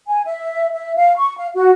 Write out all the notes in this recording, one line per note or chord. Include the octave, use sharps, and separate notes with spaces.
G#5
E5
E5
F5
C#6
F5
F#4